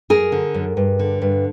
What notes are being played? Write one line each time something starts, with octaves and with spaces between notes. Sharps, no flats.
F#2 G#4 A#4
D3
F#2
G2
D3
G2